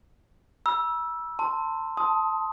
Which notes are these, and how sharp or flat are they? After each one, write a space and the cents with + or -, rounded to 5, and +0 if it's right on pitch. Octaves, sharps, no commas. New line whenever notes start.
B5 -45 E6 +0
A5 +25 C6 +0
A5 +0 C6 +0 D#6 +15